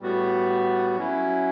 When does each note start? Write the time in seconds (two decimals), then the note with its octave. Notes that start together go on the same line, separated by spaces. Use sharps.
0.01 A2 G3 B3 F#4
0.95 F#3 C#4 E4